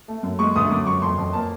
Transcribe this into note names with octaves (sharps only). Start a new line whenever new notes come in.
A3
F#2
G#3 C#6
D2 D#6
F#2 D6
F#2 C#6
F2 C6
F2
A#3 A5